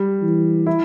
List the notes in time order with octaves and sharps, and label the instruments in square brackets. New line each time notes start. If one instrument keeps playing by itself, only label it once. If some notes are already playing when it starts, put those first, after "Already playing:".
Already playing: [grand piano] G3
[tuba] E3
[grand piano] E4